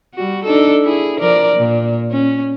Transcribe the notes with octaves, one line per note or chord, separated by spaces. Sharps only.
G3 F#4
D4 D#4 A4
E4 G#4
F3 A#4 D5
A#2
C#4